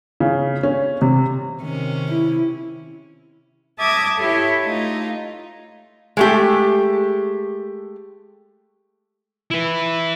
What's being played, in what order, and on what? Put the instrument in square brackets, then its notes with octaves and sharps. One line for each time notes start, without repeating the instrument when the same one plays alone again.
[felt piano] C#3
C#4
C3
[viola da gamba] C3 C#4 [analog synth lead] D#3
[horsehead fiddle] E4
[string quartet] E5 A5 D6 D#6 G#6 A#6
E4 G4 A4 C#5 E5
A3 D#4 F4
[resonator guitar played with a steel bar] G#3 A3 G4
[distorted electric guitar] E4 B4